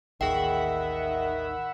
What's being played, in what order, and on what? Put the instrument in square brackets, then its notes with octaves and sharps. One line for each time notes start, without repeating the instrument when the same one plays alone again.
[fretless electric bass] A1 D#2 [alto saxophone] D#3 [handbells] G#4 G5 [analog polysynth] E5 F#5 B5